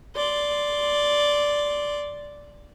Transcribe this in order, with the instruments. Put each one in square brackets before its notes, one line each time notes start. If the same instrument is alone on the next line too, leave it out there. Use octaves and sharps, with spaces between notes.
[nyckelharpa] D5 C6